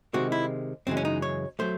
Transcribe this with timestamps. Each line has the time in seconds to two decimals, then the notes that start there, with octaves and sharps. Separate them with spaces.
0.14 C3 D#3 G#3 F#4
0.32 E4
0.87 F#2 C#3 E3 G#3 C4
0.97 C#4
1.05 D#4
1.22 C#5
1.59 F#3 A3 C5